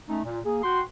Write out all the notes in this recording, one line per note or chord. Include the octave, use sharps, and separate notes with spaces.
A3 C#4 D#4
A#2
A#3 G#4
F#4 G5 C6